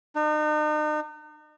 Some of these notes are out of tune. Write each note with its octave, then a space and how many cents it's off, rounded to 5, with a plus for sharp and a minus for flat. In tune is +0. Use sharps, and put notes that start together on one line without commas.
D#4 -40